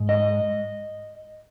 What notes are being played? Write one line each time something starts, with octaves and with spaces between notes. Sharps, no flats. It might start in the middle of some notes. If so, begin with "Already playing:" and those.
Already playing: G#2 G#3
D#5